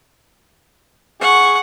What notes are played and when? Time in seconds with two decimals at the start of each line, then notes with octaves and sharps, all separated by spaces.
1.21 G#4 F#5 C#6